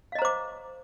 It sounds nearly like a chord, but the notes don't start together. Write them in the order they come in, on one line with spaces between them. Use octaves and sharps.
F5 D#5 A#5 C5 D6